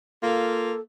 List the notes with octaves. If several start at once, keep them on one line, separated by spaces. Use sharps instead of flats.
A#3 F4 A4